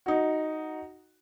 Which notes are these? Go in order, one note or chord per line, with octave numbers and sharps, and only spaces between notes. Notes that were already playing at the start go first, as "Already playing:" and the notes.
D#4 F#4